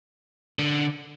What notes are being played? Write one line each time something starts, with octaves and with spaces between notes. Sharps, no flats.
D3